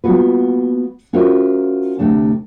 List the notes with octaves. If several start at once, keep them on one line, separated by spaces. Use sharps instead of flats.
G3 A#3 B3 F4 F#4 B4
C#4 F4 F#4 A#4 C5 E5
D2 C3 A3 D4 A5